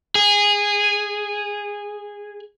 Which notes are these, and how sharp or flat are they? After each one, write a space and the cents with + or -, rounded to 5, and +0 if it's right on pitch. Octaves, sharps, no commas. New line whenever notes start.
G#4 -15